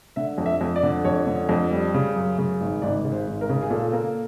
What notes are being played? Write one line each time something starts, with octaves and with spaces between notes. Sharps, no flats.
D3 E5
F2
E5
F2
D5
D3
F2 C#5
D3
F2
G3
C#3
F#2
C#3
G#1
G#1 D5
C#3
C5
G#1
A#4
C#3
G#4
A#2 A4
A#3